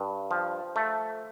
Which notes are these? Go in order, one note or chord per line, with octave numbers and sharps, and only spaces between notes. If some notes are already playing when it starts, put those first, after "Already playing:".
Already playing: G2
F3
A3